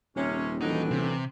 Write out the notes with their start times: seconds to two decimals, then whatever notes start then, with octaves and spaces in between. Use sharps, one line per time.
0.16 D#1 C3 C#4
0.61 A2 E3 F#3 D4 D#4
0.91 C3